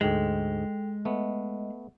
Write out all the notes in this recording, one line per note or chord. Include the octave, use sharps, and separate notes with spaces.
D2 G#2 G#3 A4 G5 F7
A3 B3 D#5